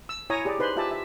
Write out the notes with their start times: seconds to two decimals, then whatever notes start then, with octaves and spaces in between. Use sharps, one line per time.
0.09 E6
0.30 E4 C#5 G#5 A#5 D#6
0.45 G4 G#4 D5
0.59 D#4 B4 C5 C6
0.76 F4 G4 E5 G#5 A5
0.91 E5